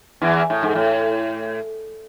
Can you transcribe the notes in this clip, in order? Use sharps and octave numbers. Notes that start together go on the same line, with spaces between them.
E2 E3
A2
G#2
A2